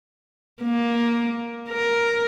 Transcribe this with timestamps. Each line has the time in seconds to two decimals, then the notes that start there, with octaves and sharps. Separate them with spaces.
0.63 A#3
1.69 A#4